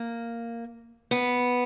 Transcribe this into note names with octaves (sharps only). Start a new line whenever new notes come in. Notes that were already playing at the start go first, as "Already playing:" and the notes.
Already playing: A#3
B3